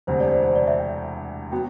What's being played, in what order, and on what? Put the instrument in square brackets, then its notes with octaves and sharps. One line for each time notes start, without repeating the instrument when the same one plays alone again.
[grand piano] E1 D2 C3 [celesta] C5
[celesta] D5
C5
C5
D5
E5
G5
[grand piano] F#3 B3 F#4 [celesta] G5